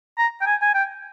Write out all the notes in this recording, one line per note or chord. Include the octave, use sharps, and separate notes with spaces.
A#5
G5
G#5
G#5
G5